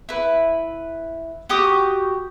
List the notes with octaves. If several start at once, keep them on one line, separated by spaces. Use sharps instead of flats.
E4 B4
F#4 G4 D6 D#6